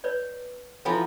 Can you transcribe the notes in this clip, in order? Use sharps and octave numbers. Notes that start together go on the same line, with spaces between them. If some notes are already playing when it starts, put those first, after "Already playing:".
B4 C#5 D5
E3 F3 B3 E4 F#4 A4